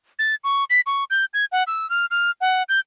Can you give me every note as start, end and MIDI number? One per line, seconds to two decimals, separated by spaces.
0.19 0.35 93
0.44 0.64 85
0.70 0.80 95
0.86 1.04 85
1.10 1.25 91
1.34 1.45 92
1.52 1.63 78
1.67 1.89 88
1.90 2.06 89
2.11 2.31 89
2.41 2.63 78
2.69 2.80 91